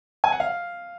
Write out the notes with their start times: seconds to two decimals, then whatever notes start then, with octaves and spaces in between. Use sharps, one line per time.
0.24 G#5
0.32 F#5
0.40 F5